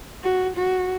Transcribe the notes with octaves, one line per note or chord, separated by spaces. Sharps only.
F#4
F#4